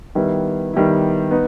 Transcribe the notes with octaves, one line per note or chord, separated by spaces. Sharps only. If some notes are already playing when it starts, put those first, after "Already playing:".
D#3 G3 B3 E4
D#3 G3 B3 E4
B3 D#4